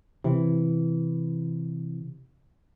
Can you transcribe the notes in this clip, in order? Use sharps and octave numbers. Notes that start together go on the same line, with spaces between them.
C3 E3